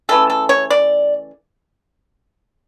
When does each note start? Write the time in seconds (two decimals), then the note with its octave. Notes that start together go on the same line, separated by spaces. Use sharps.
0.09 C#3 E3 A3 A4
0.30 A4
0.49 C#5
0.70 D5